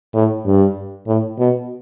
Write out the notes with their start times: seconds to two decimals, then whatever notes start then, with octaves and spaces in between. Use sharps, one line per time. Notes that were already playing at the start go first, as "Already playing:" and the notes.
0.14 A2
0.45 G2
1.07 A2
1.38 B2